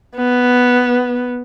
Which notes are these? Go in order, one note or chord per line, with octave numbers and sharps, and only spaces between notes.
B3